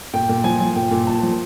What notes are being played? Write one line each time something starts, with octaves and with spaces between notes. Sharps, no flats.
A#2 G5
A#2
F3 G#5
F3
A#2 G5
A#2
F3 A5
F3